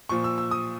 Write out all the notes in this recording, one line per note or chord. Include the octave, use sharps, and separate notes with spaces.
A#2 F3 C#6
E6
E6
D#6